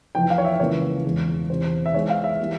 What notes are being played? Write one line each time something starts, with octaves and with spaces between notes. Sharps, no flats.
F1 F2 E3 G5
F5
C#5
E5
C#2 C#3 E3 A#3 C#5
E1 E2 E3 G#3
E1 E2 C3 C5
E5
E2 E3 G#3 C#5
F5
E5
E3 G3 A#3